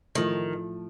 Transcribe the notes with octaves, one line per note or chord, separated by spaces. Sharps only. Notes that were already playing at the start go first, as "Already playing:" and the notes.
A2 D#3 F3 A3